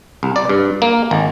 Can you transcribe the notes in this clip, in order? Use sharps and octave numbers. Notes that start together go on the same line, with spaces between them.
C2
D5
G2
A#3
G#1